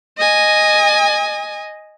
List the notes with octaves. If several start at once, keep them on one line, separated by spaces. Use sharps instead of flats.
D#5 G#5